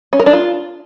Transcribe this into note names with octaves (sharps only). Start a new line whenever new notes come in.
C#4
A#4
D4
F4